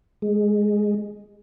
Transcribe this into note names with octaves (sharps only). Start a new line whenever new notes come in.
G#3